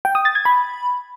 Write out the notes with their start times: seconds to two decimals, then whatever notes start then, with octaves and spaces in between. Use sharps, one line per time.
0.05 G5
0.15 D#6
0.25 A6
0.35 G#6
0.45 B5